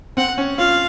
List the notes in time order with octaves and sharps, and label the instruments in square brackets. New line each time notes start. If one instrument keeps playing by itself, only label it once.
[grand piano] C4 [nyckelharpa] F#5
[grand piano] C#4
[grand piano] F4 [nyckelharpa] F5